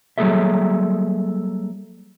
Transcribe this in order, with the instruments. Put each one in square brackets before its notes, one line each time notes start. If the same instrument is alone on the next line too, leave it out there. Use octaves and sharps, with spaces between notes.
[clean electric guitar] F#3 G3 A#3 G#4 A4 E5